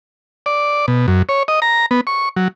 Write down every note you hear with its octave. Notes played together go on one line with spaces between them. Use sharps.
D5
B2
F#2
C#5
D#5
A#5
B3
C#6
F#3